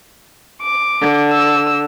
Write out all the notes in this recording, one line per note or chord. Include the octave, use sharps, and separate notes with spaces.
D6
D3
E6